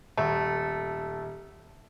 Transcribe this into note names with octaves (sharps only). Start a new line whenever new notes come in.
D#1 A3